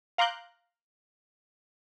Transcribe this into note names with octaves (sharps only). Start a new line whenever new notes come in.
F5 A#5 C6 D6 F#6 G6